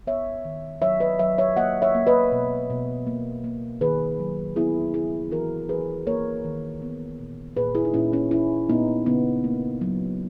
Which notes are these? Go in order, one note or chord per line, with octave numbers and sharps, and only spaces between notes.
B3 C#5 E5
D#3
F#3 C#5 E5
B4 D#5
F#3 C#5 E5
C#5 E5
A#3 D#5 F#5
C#5 E5
A#3
B4 D#5
B2
B2
A#3
A#3
D#3 G#4 B4
F#3
B3 E4 G#4
C#3 E4 G#4
E3 F#4 A#4
E3 G#4 B4
A#3 A#4 C#5
D#3
B3
A#2
A#2 G#4 B4
E4 G#4
D#4
A#2 C#4 E4
C#4 E4
A#2 C#4 E4
A#2 B3 D#4
C#3 B3
A#3
F#3